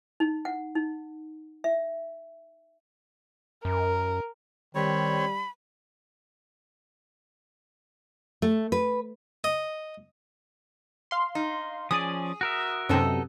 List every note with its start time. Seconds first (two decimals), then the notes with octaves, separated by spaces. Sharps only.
0.20 D#4
0.45 F#5
0.75 D#4
1.64 E5
3.65 F#2 A#4
4.75 D#3 G3 C4 C#5 B5
8.42 A3
8.72 B4
9.44 D#5
11.11 F5 C6
11.35 D#4
11.91 F3 C#4 G#4 D5 D#6
12.41 F#4 A#4 E5
12.89 F#2 C3 B3 D#4 A4